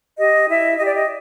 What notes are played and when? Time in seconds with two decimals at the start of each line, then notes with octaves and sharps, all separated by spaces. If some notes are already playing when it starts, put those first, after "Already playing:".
0.18 G4 D#5
0.48 E4 E5
0.76 G4 D#5
0.86 D5
0.94 D#5